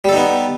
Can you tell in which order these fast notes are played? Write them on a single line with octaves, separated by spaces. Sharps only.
G3 A4 D#4 B3